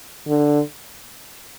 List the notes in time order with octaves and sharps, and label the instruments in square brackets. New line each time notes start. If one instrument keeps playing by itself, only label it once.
[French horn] D3